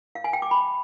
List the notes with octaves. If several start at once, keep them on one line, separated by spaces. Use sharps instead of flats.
F5
G#5
G5
D6
B5